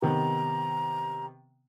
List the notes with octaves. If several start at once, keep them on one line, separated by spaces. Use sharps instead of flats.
C3 D#3 B3 A#5